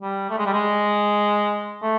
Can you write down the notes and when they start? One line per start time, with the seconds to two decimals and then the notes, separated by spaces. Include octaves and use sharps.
0.01 G3
0.30 A3
0.38 G#3
0.46 G3
0.53 G#3
1.82 A3